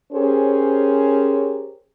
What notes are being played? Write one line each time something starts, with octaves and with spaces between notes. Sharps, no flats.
C#4 G4 G#4 A#4 C5 C#5